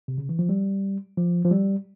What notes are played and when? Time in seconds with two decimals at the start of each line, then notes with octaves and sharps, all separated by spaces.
0.08 C3
0.18 C#3
0.29 E3
0.39 F3
0.49 G3
1.17 F3
1.45 F3
1.51 G3